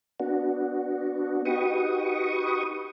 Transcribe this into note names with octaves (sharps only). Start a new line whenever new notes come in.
B3 D4 F#4
D#4 F#4 G4 B4 C#6 D#6